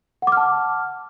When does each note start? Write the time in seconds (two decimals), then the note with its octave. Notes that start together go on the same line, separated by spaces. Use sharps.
0.22 F#5
0.27 D6
0.32 F6
0.37 A5